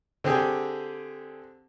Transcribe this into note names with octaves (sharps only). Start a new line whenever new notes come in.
D3 C4 G4 G#4